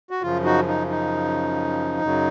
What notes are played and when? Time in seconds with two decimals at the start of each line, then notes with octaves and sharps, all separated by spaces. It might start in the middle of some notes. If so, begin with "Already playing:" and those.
0.10 F#4
0.22 F#2 C#3 F3 F4
0.44 D#4 F#4
0.68 D#4
0.89 D#4
2.02 F#2 C#3 F#3